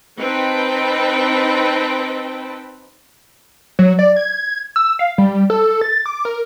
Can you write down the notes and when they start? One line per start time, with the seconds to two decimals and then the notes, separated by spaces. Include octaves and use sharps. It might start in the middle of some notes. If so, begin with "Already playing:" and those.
0.19 C4 D#4 B4 G5 A5 B5
3.79 F#3
3.99 D5
4.16 G#6
4.76 E6
4.99 F5
5.18 G3
5.50 A4
5.81 A6
6.06 D6
6.25 A#4